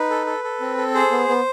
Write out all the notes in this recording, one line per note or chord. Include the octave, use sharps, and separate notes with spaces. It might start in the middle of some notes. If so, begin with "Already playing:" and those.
Already playing: D#4 B4
A4
A4
A4
C4
A4
G#4 C5
B3
B3